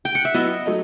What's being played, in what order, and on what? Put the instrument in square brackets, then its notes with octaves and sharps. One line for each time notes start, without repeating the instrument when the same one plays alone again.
[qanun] G5
F#5
E5
[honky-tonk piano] F#3 B3 E4 [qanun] D#5
[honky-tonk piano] F#3 A3 D#4